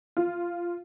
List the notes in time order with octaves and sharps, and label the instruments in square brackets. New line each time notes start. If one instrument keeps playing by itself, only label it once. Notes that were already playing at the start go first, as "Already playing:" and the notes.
[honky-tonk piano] F4